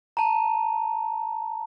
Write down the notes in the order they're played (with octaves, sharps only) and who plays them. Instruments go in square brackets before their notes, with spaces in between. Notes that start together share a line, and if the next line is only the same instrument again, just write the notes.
[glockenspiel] A5 A#5